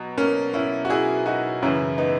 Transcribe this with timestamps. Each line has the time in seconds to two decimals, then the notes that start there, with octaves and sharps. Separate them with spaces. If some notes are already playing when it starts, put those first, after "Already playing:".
Already playing: B2 F#3
0.18 A#3 C#4
0.53 C#4 E4
0.85 F#4
0.90 E4 G#4
1.26 D#4 F#4
1.62 F#2 C#3 E3 C#4 E4
1.98 B3 D#4